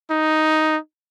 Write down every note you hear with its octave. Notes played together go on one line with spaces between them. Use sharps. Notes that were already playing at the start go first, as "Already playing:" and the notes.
D#4